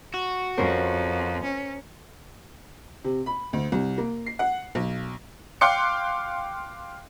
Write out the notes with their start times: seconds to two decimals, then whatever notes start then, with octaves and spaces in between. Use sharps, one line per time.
0.14 F#4
0.58 F2 C#4 A#4 C5
1.43 C#4
3.04 C3
3.26 B5
3.53 D2
3.72 C2
3.98 A#3
4.27 C7
4.39 F#5
4.75 B1
5.61 F5 G5 C6 D6 F#6 C#7